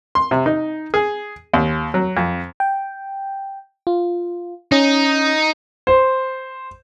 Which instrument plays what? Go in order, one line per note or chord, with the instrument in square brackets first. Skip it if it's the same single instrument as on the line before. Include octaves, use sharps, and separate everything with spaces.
[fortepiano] C6
C3
D#4
G#4
D#2
F#3
F2
[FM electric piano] G5
F4
[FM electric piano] C#4 [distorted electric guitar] D#4
[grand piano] C5